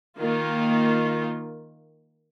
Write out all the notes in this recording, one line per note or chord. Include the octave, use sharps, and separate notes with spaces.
D#3 A#3 F4